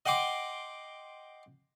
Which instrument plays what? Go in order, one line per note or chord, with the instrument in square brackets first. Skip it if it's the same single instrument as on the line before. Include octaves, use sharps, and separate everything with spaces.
[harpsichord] D#5 F#5 G5 C6 D6 D#6